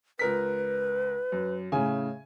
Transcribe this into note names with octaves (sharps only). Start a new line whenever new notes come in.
C#2 A#4 B4 B6
F#2
A2 C#3 G#5